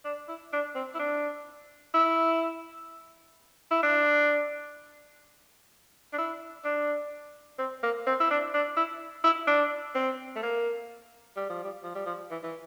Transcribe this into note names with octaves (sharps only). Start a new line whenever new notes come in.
D4
E4
D4
C4
E4
D4
E4
E4
D4
D4
E4
D4
C4
A#3
C4
E4
D4
D4
E4
E4
D4
C4
A3
A#3
G3
F3
G3
F3
G3
F3
E3
E3